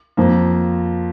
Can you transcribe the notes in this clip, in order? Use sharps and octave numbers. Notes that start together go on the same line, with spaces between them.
F2 F3 A#3